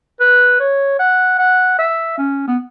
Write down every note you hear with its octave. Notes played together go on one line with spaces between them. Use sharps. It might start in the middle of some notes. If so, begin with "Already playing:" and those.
B4
C#5
F#5
F#5
E5
C#4
B3